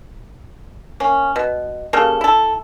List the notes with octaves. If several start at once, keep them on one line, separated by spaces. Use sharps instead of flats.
A#3 C#4
B2
C#3 G3 A#3 A4
E4 A4